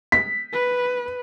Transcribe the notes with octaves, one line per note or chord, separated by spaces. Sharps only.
B6
B4